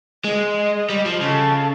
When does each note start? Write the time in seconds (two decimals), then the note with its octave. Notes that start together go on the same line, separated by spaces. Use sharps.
0.24 G#3 D#5
0.57 D#5
0.90 G3
1.06 F3
1.21 C#3 A4